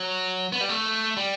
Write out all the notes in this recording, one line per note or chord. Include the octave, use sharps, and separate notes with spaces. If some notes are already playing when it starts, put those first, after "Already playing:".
Already playing: F#3
B3
G3
A3
G3